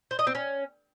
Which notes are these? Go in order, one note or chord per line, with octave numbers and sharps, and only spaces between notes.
C5
D#5
C4
C#4